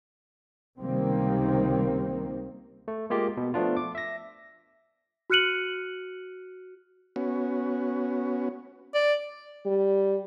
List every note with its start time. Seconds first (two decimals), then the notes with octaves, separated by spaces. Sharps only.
0.80 C#2 C3 D#3 G3 A#3 C4
2.88 A3
3.10 G#3 A#3 F4 G4
3.37 B2
3.54 F3 A3 B3 D4 F4
3.77 D6
3.95 E5 A#6
5.30 F#4 F6 F#6 C#7 D#7 F#7
7.16 B3 C#4 F#4
8.94 D5
9.66 G3